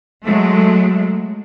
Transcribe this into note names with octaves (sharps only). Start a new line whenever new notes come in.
F#3 G#3 A3